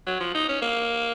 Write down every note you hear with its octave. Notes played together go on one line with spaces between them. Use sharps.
F#3
F3
D#4
C#4
A#3